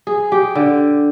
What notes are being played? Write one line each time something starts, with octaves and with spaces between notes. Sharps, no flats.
G#4
G4
D3